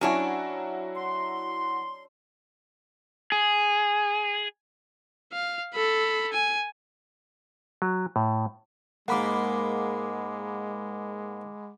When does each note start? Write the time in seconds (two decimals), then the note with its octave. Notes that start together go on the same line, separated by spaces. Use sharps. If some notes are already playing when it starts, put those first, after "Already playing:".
0.01 F#3 C#4 D4 E4 F#4 C#5
0.97 C6
3.32 G#4
5.33 F5
5.74 A4 B5
6.32 G#5
7.82 F#3
8.16 A2
9.08 G#2 G#3 A#3 F#5 B5 D6